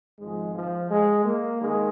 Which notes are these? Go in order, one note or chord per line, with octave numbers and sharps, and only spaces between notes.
G#1 G#2 F3 G#3
F3
G#3
A#3
D#3 G#3